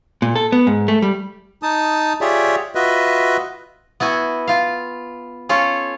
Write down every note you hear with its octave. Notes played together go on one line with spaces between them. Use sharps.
A#2
A4
B3
G#2
A3
G3
D#4 A5 D#6
F4 G4 G#4 C#5 D5 E5
F4 F#4 B4 D#5 E5
B3 E4 F#4 G#5
F4 F5
C#4 F4 A4 C#5